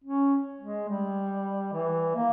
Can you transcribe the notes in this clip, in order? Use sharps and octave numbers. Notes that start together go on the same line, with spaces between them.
C#4
G#3
G3
E3
A#3